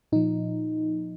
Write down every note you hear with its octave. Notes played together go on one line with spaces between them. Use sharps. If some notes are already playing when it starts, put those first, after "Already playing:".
A#2 F3 D#4